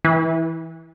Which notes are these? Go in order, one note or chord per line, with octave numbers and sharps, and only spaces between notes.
E3